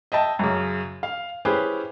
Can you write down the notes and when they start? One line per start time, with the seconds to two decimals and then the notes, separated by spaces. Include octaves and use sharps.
0.12 D#5 E5 G5 A5
0.39 F#2 C#3
1.03 F5
1.45 C#4 E4 G4 G#4 B4 C5